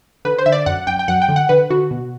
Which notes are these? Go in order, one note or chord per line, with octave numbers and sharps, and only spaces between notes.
D3 B4
C5
D3 E5
D5
F#2 F#5
F#2 G5
G5
F#2 F#5
G5
D3
F#5
D3 B4
D3 F#4
B2